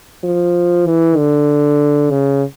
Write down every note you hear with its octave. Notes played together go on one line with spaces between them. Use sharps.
F3
E3
D3
C#3